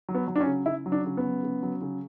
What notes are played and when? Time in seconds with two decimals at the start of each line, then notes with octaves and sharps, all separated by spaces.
0.09 F#3
0.15 B3
0.28 F#3
0.36 D4
0.40 C#4
0.46 C#3
0.66 C#3 E4
0.86 F#3
0.92 D4
1.05 C#3
1.17 B3
1.24 F#3
1.43 C#3
1.63 F#3
1.82 C#3